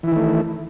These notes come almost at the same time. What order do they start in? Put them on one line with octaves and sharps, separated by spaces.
E3 E4 D#3 A3